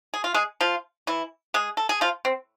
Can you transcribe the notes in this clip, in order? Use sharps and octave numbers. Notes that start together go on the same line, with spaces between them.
G#4
F4
G#3 G#4
F3 F4
E3 E4
G#3 G#4
A4
G#4
F3 F4
C4